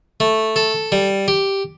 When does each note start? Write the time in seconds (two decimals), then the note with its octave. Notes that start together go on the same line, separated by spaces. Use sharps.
0.20 A3
0.56 A4
0.92 G3
1.28 G4